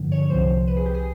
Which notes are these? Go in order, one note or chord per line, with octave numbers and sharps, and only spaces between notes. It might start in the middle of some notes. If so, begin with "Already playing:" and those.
Already playing: G2 D3 F3
C#5
C2 C3 F3 C5
B4
G#4
G4
G#4